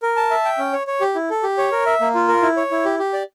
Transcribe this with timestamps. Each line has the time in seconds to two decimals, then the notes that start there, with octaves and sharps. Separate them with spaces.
0.02 A#4
0.16 A5
0.31 E5
0.45 G5
0.58 C#4
0.73 C#5
0.87 C#5
1.01 G4
1.15 E4
1.30 A4
1.43 G4
1.58 C#5
1.72 A#4
1.86 E5
2.01 A#3
2.15 F4
2.28 A#4
2.42 E4
2.57 C#5
2.71 E4
2.85 G4
2.99 G4
3.13 D5